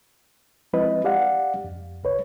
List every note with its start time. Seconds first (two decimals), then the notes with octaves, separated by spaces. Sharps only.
0.73 F3 G#3 C4 E4 B4 D#5
1.04 G4 D5 F5 F#5
1.64 F2
2.04 C2 B4 C#5